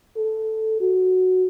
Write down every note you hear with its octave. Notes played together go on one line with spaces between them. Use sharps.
A4
F#4